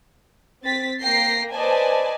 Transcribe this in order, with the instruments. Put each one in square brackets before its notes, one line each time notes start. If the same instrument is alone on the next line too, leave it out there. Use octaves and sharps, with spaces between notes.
[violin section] C4 A6 B6
A#3 G5 A#6 C7
B4 C5 D5 D#5 G#5 A5